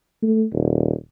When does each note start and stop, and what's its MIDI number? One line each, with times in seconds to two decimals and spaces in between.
0.22 0.44 57
0.53 0.93 27